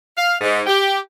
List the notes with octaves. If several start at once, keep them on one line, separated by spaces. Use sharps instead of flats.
F5
G#2
G4